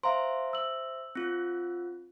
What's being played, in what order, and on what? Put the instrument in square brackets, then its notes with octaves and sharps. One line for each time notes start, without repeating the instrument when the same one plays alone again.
[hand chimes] C5 E5 [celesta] F5 A#5 C6
[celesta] E6 F#7
[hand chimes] C4 F4